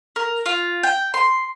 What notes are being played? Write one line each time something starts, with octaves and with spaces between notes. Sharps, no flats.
A#4
F4
G5
C6